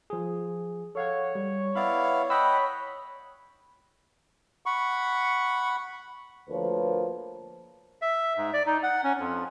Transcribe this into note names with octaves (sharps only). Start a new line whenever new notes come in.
F3 G#4
A4 C#5 F5 F#5
G3
B3 E4 D5 F5 B5
D#5 F#5 G5 B5 E6
F#5 B5 C#6
D2 F3 A#3 A#4 B4 C#5
E5
G#2
D5
D#4
F#5
C#4
F2